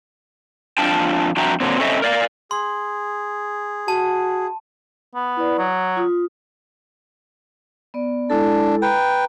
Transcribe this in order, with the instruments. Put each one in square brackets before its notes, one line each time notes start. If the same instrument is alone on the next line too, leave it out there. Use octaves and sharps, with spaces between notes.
[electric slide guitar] F2 D4 F4 G5 A5
F2 D4 F#4 E5 G5 A#5
A#2 D3 D#3 F#3 C4
C4 C#4 A4 C#5 D#5 E5
A#4 D5 F5
[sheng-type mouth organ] G#4 [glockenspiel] C6
[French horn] F#4 [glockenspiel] A5
[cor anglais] B3
[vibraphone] E4 B4 D5
[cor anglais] F#3 [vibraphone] D#6
[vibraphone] F4 D#6
B3 D5
[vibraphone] G#3 E4 A4 [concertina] D4
[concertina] B4 G5 [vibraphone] A#5